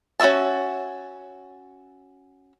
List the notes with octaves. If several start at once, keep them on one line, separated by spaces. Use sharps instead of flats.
C#4 F#4 D#5 E5 A5